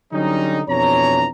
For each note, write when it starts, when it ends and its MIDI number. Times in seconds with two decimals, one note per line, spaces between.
0.13 0.62 50
0.13 0.62 54
0.13 0.62 55
0.13 0.62 61
0.13 0.62 63
0.68 1.27 41
0.68 1.27 47
0.68 1.27 52
0.68 1.27 62
0.68 1.27 73
0.68 1.27 82